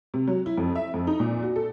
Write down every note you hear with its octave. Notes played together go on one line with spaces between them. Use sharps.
C3
F#3
E4
F2
E5
F2
D#4
A#2
F#4
A4